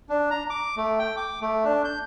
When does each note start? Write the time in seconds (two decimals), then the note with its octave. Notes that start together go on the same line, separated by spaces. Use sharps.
0.09 D4
0.31 A#5
0.50 D6
0.77 A3
0.99 G5
1.17 D6
1.42 A3
1.65 D4
1.85 G6